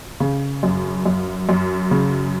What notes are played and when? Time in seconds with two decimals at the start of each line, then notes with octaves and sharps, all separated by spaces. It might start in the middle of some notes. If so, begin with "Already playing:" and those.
0.20 C#3
0.63 F#2
1.06 F#2
1.49 F#2
1.91 C#3